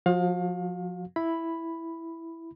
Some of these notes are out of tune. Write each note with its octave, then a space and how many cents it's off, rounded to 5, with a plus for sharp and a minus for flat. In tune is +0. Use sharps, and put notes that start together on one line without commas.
F3 +30 F#4 +0 F5 +30
E4 +0 B5 +0